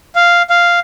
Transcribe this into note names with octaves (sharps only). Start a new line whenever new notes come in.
F5
F5